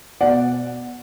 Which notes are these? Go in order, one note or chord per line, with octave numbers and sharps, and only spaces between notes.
B2 D5 F#5